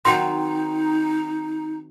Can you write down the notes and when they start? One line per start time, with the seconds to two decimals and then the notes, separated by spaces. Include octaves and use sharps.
0.05 D#3 F#3 C4 D#4 C6